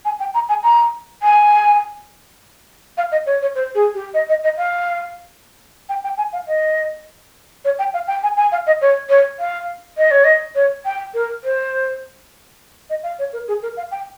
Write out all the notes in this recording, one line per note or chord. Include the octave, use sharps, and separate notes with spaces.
G#5
G5
A#5
G#5
A#5
G#5
F5
D#5
C#5
C#5
C5
G#4
G4
D#5
D#5
D#5
F5
G5
G5
G#5
F5
D#5
C#5
G5
F5
G5
G#5
G#5
F5
D#5
C#5
C#5
F5
D#5
C#5
D#5
C#5
G5
A#4
C5
D#5
F5
C#5
A#4
G#4
A#4
F5
G5